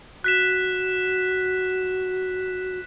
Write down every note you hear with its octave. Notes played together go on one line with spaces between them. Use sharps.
F#4 F#6 B6 E7